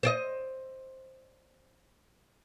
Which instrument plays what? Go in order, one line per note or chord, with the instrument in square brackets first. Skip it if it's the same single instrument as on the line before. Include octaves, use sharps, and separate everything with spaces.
[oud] C5 D5 D#5